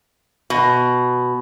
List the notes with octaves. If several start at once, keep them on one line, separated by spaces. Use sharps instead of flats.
B2